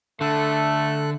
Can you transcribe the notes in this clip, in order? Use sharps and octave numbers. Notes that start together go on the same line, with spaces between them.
D3 A3 A4 F#6